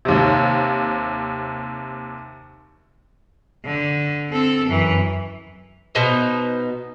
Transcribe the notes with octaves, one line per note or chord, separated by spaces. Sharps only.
D#2 C3
D3
C4 A4
F#2 E3
B2 B3 D#4 C5